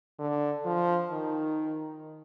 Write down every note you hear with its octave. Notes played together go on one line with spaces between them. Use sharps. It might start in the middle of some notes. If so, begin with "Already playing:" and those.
D3
F3
D#3